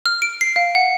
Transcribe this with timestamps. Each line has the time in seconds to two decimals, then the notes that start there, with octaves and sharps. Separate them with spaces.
0.06 F6
0.22 D7
0.41 C7
0.56 F5
0.75 F#5